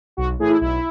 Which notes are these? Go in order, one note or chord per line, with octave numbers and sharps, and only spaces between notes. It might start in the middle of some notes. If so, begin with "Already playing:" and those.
B1 F#4
A2 E3 G#4
E4
B1 E4